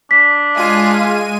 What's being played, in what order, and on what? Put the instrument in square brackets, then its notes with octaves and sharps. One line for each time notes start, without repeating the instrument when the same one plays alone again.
[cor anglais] D4 [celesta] B6
[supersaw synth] G#3 G#5 D#7 [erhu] F4